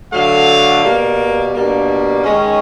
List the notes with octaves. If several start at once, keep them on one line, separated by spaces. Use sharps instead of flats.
D3 F#3 A3 F5
B2 G3 A#3
B2 G3 A#3 D4
D#3 G#3 C#4